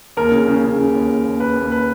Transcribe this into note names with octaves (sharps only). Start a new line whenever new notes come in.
D#2 A#4
C#3
C#3
C#3
C#3
D#2
D#2
D#2
D#2 B4
D#2
B4